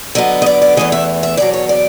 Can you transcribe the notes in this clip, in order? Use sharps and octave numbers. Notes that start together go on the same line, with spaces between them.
D3 F#3 B3 D#5
D#5
D5
D5
E2 C3 E3 A3 D#5
E5
E5
E2 B2 F#3 D5
C#5
D5